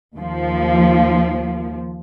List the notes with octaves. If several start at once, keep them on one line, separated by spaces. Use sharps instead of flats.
D#2 F3